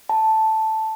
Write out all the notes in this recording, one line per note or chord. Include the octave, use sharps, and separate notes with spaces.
A5